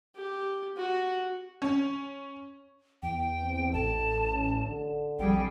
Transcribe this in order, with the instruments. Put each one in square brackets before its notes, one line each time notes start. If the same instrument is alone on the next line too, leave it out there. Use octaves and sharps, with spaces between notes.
[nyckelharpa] G4
F#4
[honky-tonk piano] C#4
[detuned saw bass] E2 [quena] G5
[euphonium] C4
[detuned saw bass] A1 [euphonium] A4 [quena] A5
[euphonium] C#4
D3
[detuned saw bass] A#1 [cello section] F2 G3 G#4 [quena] G5